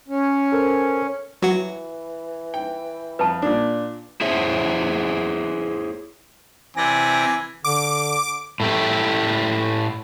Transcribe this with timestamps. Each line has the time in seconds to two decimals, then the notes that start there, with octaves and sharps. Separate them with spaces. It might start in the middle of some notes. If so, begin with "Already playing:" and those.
0.08 C#4
0.52 A4 A#4 C5
1.42 E3 F#3 F#4
2.54 G5
3.19 F2 B4 A5
3.42 A#2 D4
4.21 E4 G#4 C5 C#5 E5
6.77 C3 E3 D5 G#5 A#6
7.64 D3 D6
8.60 A2 A3 G4